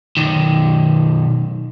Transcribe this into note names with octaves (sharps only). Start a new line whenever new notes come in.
B1 D#3